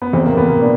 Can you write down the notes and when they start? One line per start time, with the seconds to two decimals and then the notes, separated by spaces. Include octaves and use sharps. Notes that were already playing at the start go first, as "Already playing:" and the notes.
0.02 B3
0.13 E2 C4
0.26 A#3
0.37 E2 B3
0.49 A#3
0.61 B2 D4